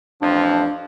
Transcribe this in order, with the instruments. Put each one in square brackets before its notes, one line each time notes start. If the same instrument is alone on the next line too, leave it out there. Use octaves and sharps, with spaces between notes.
[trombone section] A1 F2 F3 [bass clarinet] D4